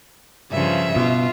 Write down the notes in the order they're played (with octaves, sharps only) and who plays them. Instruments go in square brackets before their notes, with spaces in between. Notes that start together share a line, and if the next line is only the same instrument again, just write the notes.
[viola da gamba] G2 C#3 F3 [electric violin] E5
[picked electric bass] B2 [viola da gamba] F4